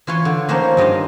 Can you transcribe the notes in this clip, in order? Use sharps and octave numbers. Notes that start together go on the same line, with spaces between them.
E3 F4 B4 C#5
D3
D#3 F3 A#3 C#4 C5 C#5
G2 D#3 D#5 F5